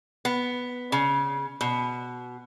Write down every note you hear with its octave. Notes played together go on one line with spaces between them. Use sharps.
B3
C#3
B2